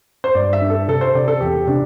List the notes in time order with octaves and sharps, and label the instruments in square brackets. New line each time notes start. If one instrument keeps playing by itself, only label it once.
[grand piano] C5
[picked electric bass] G2 [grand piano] D5
[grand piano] E5
[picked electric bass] D4
[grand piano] A4
[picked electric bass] C3 [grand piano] A4
[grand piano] C5
[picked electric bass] C3 [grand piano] D5
[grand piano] A4
[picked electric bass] E2 [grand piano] G4
[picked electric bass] C3 [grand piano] D4